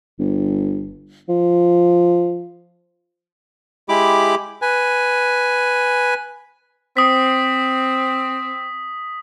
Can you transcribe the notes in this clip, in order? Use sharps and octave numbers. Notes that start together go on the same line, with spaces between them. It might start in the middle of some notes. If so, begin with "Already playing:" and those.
G1
F3
G#3 E4 G4 B5 D6
B4 G#5
C4 D#6 B6